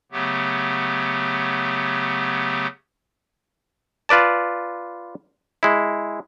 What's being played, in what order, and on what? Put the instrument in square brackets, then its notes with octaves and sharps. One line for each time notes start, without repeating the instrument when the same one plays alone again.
[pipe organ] C#3 F#3 A3 B3 G4
[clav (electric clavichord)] F4 B4 D5 A5
G#3 E4